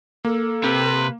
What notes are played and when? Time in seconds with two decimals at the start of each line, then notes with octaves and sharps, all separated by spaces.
0.25 A#3 A4
0.64 C3 B4